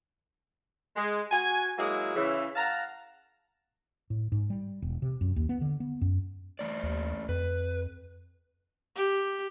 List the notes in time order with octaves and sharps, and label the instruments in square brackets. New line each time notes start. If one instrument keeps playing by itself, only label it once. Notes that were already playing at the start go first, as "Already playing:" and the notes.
[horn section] G#3
F#4 G#5
F#3 G#3 A#3 E4 G#4
C#3 E3
F5 F#5 A5 A#5
[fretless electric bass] A2
G#2
G3
E1
C3
F#2
D#2
B3
D3
B3
F#2
[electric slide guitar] E3 A3 D5
[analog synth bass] D#2
[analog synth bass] F2 [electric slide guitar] B4
[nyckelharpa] G4